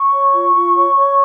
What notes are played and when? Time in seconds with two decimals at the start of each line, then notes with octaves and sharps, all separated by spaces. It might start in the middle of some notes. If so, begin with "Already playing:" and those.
Already playing: C#6
0.13 C#5
0.33 F4
0.54 F4
0.75 C#5
0.96 C#5